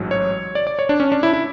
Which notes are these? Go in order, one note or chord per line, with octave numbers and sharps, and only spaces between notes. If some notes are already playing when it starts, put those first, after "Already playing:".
Already playing: A1 G#2 F#3
C#5
D5
D5
C#5
D4
C#4
D4
E4
E4